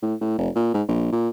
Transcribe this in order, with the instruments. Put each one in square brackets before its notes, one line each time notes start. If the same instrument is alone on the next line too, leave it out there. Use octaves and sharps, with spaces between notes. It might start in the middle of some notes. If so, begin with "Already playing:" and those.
[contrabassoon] A2
A2
F1
A#2
G#2
A#1
A#2